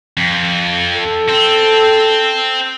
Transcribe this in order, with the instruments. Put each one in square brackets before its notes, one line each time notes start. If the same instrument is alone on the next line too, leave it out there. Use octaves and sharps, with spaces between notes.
[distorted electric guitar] F2
[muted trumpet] A4
[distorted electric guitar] C4